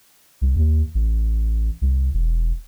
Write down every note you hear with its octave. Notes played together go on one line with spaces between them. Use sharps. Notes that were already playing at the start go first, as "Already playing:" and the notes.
C2
D#2
A1
C2
E1